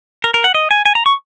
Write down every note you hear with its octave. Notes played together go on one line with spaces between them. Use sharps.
A#4
A#4
F#5
D#5
G#5
G#5
A#5
C#6